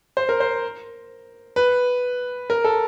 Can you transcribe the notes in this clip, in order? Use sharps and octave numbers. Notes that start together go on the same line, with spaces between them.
C5
A#4
C5
B4
A#4
A4